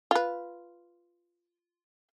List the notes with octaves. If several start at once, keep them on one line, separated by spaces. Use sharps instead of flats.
F4 B4